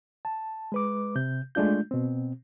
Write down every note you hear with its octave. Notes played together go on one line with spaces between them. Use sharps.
A5
G#3 B4 D6
C3 G6
G#3 A3 D4 F4 G6
B2 C4